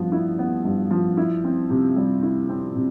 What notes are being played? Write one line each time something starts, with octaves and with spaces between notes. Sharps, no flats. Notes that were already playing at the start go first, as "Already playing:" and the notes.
Already playing: G2 F3 B3
E4
B3
G2
F3
E4
C4
C3
G3
E4
C4
C3